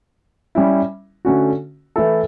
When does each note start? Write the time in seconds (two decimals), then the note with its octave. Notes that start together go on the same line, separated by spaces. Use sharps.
0.55 G3 C#4 E4
1.25 D3 A3 C#4 F#4
1.96 E3 A3 E4 A4